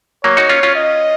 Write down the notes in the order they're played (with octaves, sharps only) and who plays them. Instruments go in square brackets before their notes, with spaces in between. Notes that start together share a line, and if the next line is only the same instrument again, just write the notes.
[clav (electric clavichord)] F#3 A#3 [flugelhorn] C#5
[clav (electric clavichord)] D#4 F#4
C#4 F4
C#4 F4
[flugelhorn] D#5